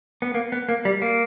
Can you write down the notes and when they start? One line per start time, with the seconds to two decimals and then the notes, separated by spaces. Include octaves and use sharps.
0.22 B3
0.34 A#3
0.52 B3
0.69 A#3
0.85 G3
1.02 A#3